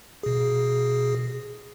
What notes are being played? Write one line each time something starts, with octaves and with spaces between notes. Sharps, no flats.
B2 G#4